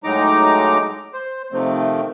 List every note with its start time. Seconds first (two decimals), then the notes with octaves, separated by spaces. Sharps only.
0.04 A2 F#3 G#3 D#4 A#5 D6
1.13 C5
1.52 C3 D#3 F3 A3 C4